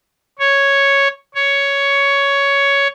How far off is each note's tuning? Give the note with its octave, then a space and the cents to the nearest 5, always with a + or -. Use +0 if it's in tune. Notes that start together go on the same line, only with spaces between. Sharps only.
C#5 +0
C#5 +10